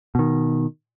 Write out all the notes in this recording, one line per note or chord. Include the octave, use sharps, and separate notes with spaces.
B2 D#3